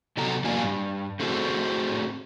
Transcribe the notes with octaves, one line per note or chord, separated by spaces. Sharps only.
C3 F#3 B3 A4 A#5
E2 F#3 A#3 D5 F5 G#5
G2
A3 C4 F#4 G#4 A4 C5